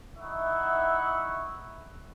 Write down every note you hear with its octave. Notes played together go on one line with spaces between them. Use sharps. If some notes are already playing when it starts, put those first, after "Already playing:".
D#4 E4 E5 F#5 C#6